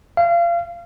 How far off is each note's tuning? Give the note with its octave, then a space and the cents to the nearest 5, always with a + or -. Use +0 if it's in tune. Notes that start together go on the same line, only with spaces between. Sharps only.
F5 -30